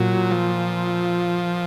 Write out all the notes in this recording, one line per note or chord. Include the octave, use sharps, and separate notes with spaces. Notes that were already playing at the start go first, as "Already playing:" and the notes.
Already playing: A#2 F#3
F3